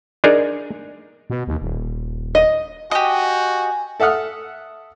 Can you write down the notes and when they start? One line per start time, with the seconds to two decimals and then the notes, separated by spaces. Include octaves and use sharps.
0.24 D4 D#4 G#4 A#4
1.30 B2
1.47 D#2
1.62 D#1
2.35 D#5
2.91 F#4 G4 D#5 G#5
4.00 A4 E5 F#5 D#6 F6